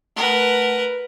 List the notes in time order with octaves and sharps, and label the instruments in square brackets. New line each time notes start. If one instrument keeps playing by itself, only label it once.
[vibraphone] A3 F#5 [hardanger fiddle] A#4 B4